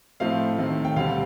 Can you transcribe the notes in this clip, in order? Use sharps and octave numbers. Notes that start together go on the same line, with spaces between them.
A2 F3 A3 C4 F5
D#2 D#3 A3 C4
G5
D2 D3 G3 C4 F5